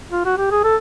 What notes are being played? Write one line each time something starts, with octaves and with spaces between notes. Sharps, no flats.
F4
F#4
G4
G#4
A4